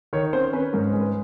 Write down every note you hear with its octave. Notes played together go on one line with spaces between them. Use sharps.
D#3 C#5
C#4 C5
C#4 B4
G#2 A#4
B4
G#3
B4